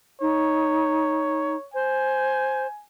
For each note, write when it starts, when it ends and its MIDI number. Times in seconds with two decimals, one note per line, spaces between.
0.21 1.56 63
0.21 1.68 73
1.74 2.67 72
1.74 2.84 80